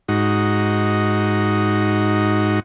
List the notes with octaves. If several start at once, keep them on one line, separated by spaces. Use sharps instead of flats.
G#2 D#4 F#4